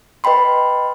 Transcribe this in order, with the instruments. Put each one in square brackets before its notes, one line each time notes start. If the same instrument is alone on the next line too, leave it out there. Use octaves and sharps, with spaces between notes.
[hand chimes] B4 D#5 G5 B5 C6